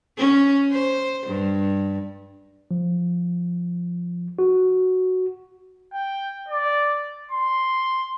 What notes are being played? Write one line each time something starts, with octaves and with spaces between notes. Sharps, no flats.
C#4
C5
G2
F3
F#4
G5
D5
C6